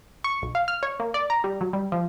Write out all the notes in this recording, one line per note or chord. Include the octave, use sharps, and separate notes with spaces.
C#6
B1
F5
F6
C#5
A#3
D5
A#5
G3
F#3
G3
F3